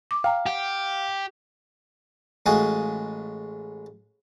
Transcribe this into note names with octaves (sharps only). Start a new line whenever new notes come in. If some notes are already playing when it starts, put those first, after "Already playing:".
D6
F5 G5 A#5
G4 F#5
A1 G#3 F4 F#4 G#5 D#6